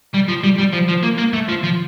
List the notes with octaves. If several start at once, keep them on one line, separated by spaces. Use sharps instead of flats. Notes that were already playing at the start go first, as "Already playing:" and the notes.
G3
F3
G3
G3
F3
F3
A#3
A#3
A3
F3
F3